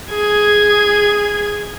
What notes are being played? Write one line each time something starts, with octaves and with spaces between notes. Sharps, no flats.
G#4 G#6